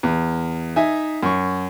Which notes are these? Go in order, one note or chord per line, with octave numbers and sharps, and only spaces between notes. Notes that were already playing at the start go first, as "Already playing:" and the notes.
E2
D#4 E5 G#5
F#2 C#6